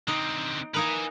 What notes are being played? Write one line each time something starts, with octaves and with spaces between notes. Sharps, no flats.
D3 C4 D#4
A#3 D#4 A#4 B4 G#5